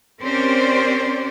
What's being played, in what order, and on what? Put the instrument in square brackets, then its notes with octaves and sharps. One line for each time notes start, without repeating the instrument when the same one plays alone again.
[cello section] C4 C#4 G4 A#4 C5 D5